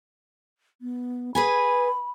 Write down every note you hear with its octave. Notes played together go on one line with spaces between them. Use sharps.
B3
G#4 B4 G#5 B5